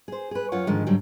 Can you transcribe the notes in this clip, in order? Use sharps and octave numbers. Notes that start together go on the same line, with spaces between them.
G#4 C5
G#4 B4
F#2 F4 C#5 F#5
G#2 D3 D#3 F3 G#3
G#2 D3 F#3 G3